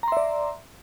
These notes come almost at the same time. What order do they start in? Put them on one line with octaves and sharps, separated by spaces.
A#5 C6 E5 D5